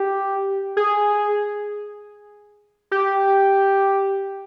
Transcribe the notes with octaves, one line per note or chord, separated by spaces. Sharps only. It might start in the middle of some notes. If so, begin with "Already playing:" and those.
Already playing: G4
G#4
G4